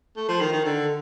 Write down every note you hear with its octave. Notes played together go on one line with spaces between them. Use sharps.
A3
F3
D#3
D#3
D3